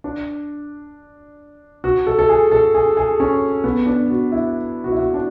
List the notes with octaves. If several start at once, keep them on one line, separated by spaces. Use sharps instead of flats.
D4
F#4
A4
A4
G#4
A4
G#4
G#4
C#4
B3
D4
F#4
E4
F#4
E4
F#4
D4